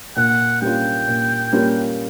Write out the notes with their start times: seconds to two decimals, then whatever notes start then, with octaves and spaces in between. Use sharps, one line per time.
0.16 A#2 F#5
0.61 G3 A#3 C#4 F4 G5
1.07 A#2
1.53 G3 A#3 C#4 F4